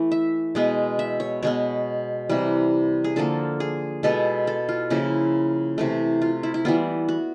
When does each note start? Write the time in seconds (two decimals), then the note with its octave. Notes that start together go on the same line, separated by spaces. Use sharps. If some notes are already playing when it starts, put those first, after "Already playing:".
Already playing: E3 A3
0.12 E5
0.55 B2 G#3 B3
0.99 E5
1.20 C#5
1.43 B2 G#3 B3 C#5
2.29 C3 E3 G3
3.04 G#4
3.16 D3 F3 A#3 A4
3.60 G#4
4.03 B2 G#3 B3 A4
4.47 A4
4.69 F4
4.90 C#3 F3 A#3 E4
5.78 C3 E3 A3
6.22 F4
6.43 E4
6.54 E4
6.65 E3 G3 B3 F4
7.09 F#4